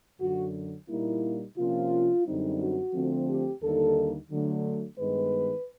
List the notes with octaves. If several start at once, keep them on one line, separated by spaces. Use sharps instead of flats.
F#2 D3 F#3 F#4
A#2 G3 A#3 D#4 E4
C3 F3 A#3 C#4 F4
F#2 D3 G3 C4 D#4
F#4
D3 F3 A3 C4
G4
D#2 D3 G3 A#3 D#4 A4
D3 F#3 A3
G2 D#3 G#3 B3 B4